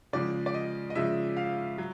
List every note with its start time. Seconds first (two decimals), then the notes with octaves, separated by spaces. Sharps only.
0.13 C#3 F3 G#3 D5
0.46 D5
0.54 D#5
0.90 D#5
0.95 C#3 F3 G#3 E5
1.37 F5
1.78 F#3